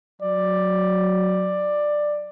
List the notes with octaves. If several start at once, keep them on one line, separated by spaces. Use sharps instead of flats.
F#3 D5